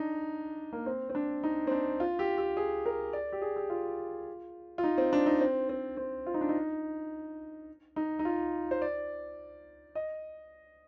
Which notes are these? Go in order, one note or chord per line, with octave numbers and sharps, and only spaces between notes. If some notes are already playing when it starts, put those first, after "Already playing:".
Already playing: D4 D#4
A#3
C4
C4
D4
D#4
C4
D4
F4
G4
G4
G#4
A#4
D5
G4
G#4
G4
F4
F4
D#4
C4
D4
D#4
C4
C4
C4
F4
D#4
D4
D#4
D#4
D#4
F4
C5
D5
D#5